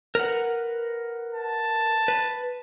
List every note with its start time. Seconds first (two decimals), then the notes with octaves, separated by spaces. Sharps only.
0.15 A#4 B4 F#5
1.34 A5
2.08 B4